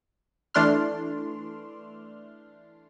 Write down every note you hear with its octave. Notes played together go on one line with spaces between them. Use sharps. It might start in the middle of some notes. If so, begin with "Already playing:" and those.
E3 A3 D4 C6 F6